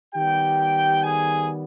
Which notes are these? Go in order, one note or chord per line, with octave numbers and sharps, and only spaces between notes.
D#3 G3 B3 G4 G5
G#4 G#5